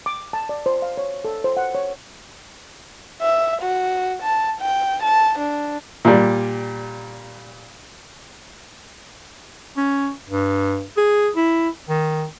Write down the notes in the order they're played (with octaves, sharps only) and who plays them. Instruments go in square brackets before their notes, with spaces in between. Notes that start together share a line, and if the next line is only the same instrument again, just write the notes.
[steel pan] D6
A5
D5
C5
F5
C#5
A4
C5
F#5
C#5
[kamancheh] E5
F#4
A5
G5
A5
D4
[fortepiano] A#2 G3
[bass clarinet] C#4
G2
G#4
E4
D#3